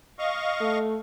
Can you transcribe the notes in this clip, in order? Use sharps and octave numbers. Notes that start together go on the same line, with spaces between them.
D#5 F5 C#6
A3